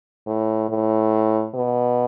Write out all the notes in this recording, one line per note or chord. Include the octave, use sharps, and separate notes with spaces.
A2
A2
B2